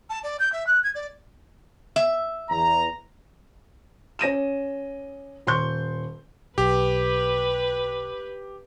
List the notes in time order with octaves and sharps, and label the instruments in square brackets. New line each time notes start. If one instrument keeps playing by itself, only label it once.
[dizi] A5
D5
G6
E5
F#6
G#6
D5
[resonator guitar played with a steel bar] E5
[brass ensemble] E2 A#5
[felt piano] C#4 A#6 D#7 E7
D#1 C6 C#6 G6
[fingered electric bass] B1 [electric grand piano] G4 [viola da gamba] B4